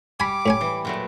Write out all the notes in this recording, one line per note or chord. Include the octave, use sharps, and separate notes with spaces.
G3 G#5 B5 D6
A2 C#4 G#5
E3
A#2 F#3 A3